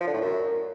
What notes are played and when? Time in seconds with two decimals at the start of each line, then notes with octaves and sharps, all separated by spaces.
0.01 F3
0.07 D3
0.14 A2
0.21 F#2